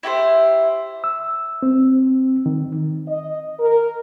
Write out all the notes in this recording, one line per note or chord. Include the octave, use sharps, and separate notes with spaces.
E4 G4 A4 C5
E6
C4
D#3
D#5
A#4